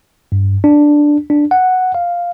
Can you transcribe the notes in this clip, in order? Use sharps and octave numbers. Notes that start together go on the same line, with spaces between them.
G2
D4
D4
F#5
F5